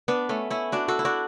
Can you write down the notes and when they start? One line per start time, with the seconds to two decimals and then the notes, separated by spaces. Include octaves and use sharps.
0.08 B3 D4
0.29 A3 C#4
0.50 C#4 E4
0.72 D4 F#4
0.88 F#4 A4
0.99 E4
1.05 D4 F#4